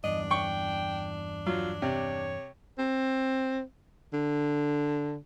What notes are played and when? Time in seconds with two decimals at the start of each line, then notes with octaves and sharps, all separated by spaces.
0.04 E2 G2 D4 D#5
0.31 G5 C#6
1.47 F#3 F4
1.82 C3 C#5
2.78 C4
4.13 D3